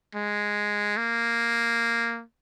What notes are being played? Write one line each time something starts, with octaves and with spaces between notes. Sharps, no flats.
G#3
A#3